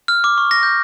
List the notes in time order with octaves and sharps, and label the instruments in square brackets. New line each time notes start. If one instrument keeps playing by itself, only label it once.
[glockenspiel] F6
D6
C#6
A#6
G6